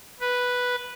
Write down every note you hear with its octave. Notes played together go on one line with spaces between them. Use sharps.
B4